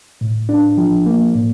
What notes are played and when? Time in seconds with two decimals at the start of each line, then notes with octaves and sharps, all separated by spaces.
0.21 A2
0.49 D4
0.78 F3
1.06 A#3
1.34 A2